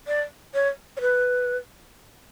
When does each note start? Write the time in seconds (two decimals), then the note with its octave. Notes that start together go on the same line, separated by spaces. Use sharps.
0.08 D5
0.54 C#5
0.97 C#5
1.01 B4